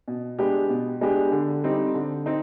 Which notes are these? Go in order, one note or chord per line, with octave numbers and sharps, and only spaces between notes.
B2
G#3 B3 D4 G4
B2
G#3 B3 D4 G4
D3
G3 C4 D#4
D3
C4 D#4